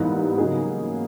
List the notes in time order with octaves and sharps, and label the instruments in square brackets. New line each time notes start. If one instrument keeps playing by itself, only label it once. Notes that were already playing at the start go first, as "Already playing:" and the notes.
Already playing: [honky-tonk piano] G#2 E3 G3 B3 [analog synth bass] A#3
[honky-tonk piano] C#3 F#3 B3 D#4 G#4